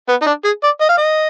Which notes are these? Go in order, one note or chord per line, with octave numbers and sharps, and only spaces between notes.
B3
D#4
D4
G#4
D5
D#5
F5
D#5